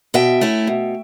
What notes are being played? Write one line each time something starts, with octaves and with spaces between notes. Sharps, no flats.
B2 E5 G5
A3 C#4 E4
B2